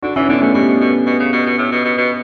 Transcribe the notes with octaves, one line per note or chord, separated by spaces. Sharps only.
D3 D4 F#4
E3 C#4 E4
D3 B3 D4
B2 A3 C#4
B2 G3 B3
B2
B2
B2
C#3
B2
B2
A2
B2
B2
B2